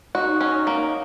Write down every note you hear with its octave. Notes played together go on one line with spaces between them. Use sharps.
D#4 F#4
C#4 D#4
A#3